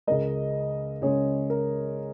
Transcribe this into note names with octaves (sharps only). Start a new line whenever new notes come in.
C#2 C#3 G#3 A#4 D#5
C#2 C#3 G#3 G#4 C#5
A#4